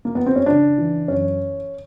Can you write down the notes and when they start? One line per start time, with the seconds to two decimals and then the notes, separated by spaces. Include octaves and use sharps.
0.05 A#3
0.15 B3
0.26 C4
0.36 C#4
0.46 C#3 D4
0.78 E3
1.08 F#2 C#4